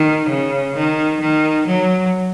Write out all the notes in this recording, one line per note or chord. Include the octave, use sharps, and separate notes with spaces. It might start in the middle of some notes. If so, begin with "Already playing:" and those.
Already playing: D#3
C#3
D#3
D#3
F#3